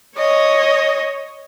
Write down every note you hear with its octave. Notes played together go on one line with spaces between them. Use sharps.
C#5 D#5